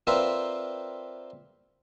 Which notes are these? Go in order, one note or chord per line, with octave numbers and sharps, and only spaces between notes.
C4 F4 A#4 B4 D5 E5